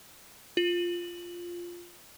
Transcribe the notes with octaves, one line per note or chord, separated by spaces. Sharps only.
F4 F#7